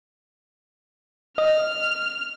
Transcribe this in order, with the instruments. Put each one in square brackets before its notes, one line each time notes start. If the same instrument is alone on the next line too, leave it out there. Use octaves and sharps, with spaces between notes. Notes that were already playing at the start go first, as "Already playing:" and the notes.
[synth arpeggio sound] D#5 [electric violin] F6